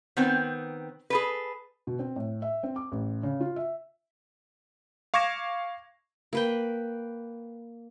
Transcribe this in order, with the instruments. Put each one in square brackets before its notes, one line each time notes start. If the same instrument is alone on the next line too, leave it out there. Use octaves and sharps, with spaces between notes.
[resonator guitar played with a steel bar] D#3 B3 C4
G#4 A4 B4
[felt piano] B2
C4
A2
E5
C4
D6
A1
C#3
F4
E5
[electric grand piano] F5 C#6 D6 G#6 A#6 E7
[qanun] A#3 B4 G5